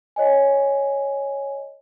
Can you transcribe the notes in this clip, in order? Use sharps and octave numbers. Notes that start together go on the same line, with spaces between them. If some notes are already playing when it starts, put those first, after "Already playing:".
C#5 D#5 G#5